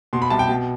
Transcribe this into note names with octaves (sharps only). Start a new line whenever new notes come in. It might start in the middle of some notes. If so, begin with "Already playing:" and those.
B2 C6
B5
C2 A5
G5
B2